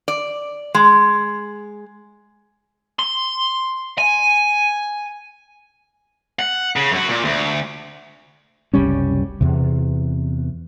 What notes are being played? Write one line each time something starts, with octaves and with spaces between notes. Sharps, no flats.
D5
G#3
C6
G#5
F#5
C#3
F#2 F#4
A#2
D2
F#1 C2 G3 C#4
E2 C3